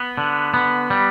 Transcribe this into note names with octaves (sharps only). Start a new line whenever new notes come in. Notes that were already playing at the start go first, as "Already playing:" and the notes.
Already playing: B3
D3
B3
G3